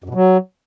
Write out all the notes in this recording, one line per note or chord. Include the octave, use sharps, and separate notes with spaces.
F#2
B2
F#3